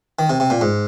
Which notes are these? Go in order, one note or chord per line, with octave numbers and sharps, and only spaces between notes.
D#3
C3
C3
A#2
G#2